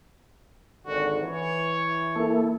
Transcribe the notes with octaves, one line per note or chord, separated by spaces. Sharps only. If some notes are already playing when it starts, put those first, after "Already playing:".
G#1 D3 F#4
E3 C#5
A#3 E4 A4